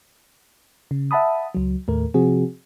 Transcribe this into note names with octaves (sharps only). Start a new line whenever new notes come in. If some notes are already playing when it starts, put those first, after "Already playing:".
C#3
E5 F#5 A5 B5 D#6
C#2 F#3
D#2 A2 A3 A#4
C3 F3 C4 F#4 G#4